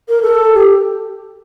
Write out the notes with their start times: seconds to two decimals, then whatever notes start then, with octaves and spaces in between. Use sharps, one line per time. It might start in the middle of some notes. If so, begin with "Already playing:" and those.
0.09 A#4
0.22 A4
0.54 G4